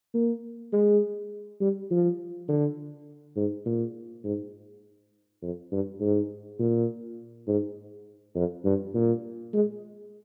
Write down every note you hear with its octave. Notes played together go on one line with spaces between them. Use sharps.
A#3
G#3
G3
F3
D3
G#2
A#2
G#2
F2
G2
G#2
A#2
G#2
F2
G2
A#2
G#3